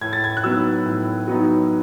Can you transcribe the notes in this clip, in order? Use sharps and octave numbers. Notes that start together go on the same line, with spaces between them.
A2 G#6
A6
G#6
F#6
F#3 B3 D#4 E6
A2
F#3 B3 D#4